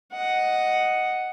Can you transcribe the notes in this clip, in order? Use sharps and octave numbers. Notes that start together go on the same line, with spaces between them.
D#5 F#5